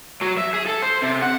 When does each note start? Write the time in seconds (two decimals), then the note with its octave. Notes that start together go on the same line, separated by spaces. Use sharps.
0.21 F#3
0.37 E5
0.53 G#4
0.66 A4
0.82 C5
1.03 C3
1.23 F#5